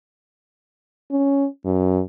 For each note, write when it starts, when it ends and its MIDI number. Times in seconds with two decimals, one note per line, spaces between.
1.11 1.46 61
1.65 2.02 42